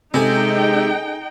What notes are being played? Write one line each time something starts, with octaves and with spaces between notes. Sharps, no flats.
C3 G#3 C#4 D#4 G#4 A4 G5